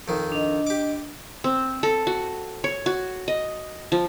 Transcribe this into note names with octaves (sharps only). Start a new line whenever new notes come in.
F2 D#3
D4 D#5
G4 D6
C4
A4
F#4
C#5
F#4
D#5
F3